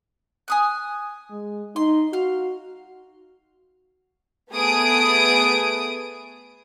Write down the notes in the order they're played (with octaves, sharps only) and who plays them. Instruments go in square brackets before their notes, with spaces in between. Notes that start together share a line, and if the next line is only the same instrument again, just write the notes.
[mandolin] G#5 D#6 F#6
[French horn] G#3
[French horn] D#4 [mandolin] C6
[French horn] F#4 [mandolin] F5
[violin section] A3 B3 G#4 B4 D#6 D7